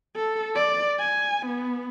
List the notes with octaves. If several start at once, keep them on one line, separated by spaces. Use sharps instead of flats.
A4
D5
G#5
B3